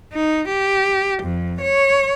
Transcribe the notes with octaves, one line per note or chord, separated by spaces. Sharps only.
D#4
G4
F2
C#5